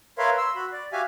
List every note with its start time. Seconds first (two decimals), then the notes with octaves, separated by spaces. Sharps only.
0.18 A#4 B4 C#5 E5 F5 C6
0.37 C6 E6
0.56 F#4 B5
0.72 D5
0.92 F#4 G4 E5 F5 G#5